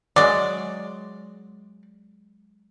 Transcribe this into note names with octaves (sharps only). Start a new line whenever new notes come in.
F#3 G#3 D5